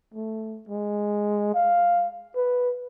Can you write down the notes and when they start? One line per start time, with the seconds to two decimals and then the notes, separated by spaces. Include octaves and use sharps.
0.14 A3
0.69 G#3
1.54 F5
2.36 B4